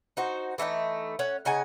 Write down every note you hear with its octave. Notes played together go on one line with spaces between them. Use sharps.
D#4 F#4 C5
E3 A3 A#3 D#4
C#4 F#5
C#3 D#4 F#5 G#5